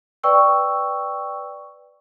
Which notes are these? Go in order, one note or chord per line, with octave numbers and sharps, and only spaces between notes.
B4 D5 G5 C#6 E6